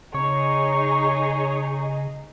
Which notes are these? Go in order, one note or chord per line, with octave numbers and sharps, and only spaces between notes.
C#3 D#4 G#4 C#5 C#6